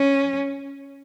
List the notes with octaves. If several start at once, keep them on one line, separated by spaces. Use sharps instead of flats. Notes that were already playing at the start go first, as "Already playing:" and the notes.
Already playing: C#4